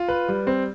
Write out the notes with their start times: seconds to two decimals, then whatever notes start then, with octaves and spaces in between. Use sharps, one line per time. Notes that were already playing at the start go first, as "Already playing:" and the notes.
Already playing: F4
0.09 B4
0.28 G3
0.47 C4